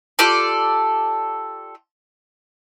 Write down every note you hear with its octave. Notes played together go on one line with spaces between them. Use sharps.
F4 G4 A4 D5